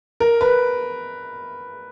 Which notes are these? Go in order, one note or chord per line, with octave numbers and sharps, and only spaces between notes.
A#4
B4